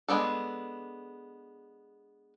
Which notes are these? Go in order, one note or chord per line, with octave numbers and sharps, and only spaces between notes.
G#3 B3 D4 A4